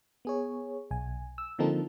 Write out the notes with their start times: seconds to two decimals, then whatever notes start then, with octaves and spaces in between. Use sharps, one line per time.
0.25 B3 G#4 C#5
0.91 B1 G#5
1.38 E6
1.58 D3 F3 A#3 C4 D#4 A4